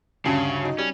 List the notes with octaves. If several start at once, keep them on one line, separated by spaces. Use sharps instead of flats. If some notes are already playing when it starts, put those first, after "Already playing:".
D2 G2 C#3 C#4
F#3 D#4
G3 C#4